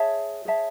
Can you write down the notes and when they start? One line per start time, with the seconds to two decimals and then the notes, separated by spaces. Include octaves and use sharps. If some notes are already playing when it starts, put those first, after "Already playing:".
Already playing: G#4 C#5 E5 A5
0.45 G#4 C#5 E5 A5